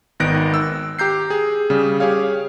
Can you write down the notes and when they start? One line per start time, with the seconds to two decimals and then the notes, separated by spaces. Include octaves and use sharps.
0.20 G#1 D#3 B3 F#6 A#6 D7
0.54 E6
0.99 G4 A#5 G6 C7
1.30 G#4
1.70 C#3 G3
2.00 G4 G#4 C#5 F5